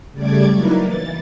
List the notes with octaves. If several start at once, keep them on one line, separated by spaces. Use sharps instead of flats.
C#3 G3 A3 D5 D6 G#6
F#3 A#3 D#4 E4 A#4 B4
E3 A6